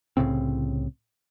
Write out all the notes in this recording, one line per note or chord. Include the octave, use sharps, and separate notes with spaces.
C2 A2 C#3 C4